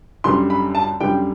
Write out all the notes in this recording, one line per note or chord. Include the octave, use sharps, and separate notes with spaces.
F#2 D3 G3 C6
B5
A5
F#2 D3 G3 G5